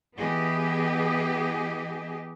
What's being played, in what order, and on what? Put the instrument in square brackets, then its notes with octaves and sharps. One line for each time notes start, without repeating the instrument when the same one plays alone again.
[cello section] E3 B3 G4 G#4 D#5